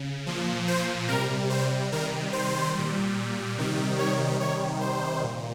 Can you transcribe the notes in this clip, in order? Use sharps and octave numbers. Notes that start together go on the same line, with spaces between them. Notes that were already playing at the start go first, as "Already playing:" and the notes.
Already playing: C#3
A#2 F3
C5
C3 G3 A#4
C5
C3 D#3 G3 A#4
C5
A#2 G3
C3 D#3 G3
C#5
C3 D#3 G3 C#5
C5
A#2